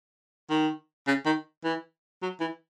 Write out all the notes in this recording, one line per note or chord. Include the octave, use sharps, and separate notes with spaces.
D#3
C#3
D#3
E3
F#3
E3